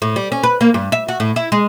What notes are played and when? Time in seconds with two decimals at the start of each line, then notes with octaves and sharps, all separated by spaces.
0.02 A2
0.16 G3
0.32 C#4
0.44 B4
0.61 A#3
0.74 G2
0.92 E5
1.08 F#4
1.20 A2
1.36 E4
1.52 G#3